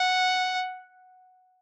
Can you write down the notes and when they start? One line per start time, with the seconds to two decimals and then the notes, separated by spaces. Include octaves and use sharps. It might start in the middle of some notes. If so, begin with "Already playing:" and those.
Already playing: F#5